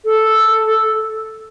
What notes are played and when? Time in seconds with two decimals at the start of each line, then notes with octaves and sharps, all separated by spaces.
0.05 A4